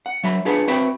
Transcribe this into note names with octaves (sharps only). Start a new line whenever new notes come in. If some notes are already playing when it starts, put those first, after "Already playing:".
F#5
F#3 E5 B5
D4 F4 G#4 B4 F#5
C4 F#4 B4 E5 G5 B5